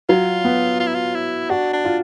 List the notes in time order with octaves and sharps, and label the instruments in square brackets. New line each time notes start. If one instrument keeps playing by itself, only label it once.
[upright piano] F#3 [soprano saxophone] F4
[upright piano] B3
[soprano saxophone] F4
E4
F4
E4
[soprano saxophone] D4 [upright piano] F#4
[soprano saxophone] D4
[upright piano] F4